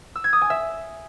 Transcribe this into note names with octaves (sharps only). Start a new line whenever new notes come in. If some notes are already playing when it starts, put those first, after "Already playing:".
E6
G#6
D#6
G#5
E5